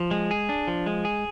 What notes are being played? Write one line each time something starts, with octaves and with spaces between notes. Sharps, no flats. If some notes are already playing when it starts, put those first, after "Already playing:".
Already playing: F3
G#3
G#4
D4
F3
G#3
G#4